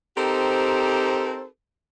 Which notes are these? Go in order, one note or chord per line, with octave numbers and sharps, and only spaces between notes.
C4 D#4 G4 A4 A#4 C5